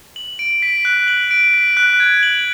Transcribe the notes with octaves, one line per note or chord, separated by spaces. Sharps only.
F#7
D7
B6
F#6
F#7
D7
B6
F#6
G#6
F#7